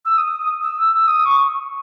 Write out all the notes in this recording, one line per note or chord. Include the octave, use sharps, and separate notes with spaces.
E6
D#6
E6
E6
D#6
C#6